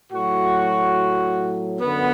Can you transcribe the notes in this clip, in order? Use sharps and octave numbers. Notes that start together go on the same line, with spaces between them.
A2 F#3 F#4
F#2 D3 B3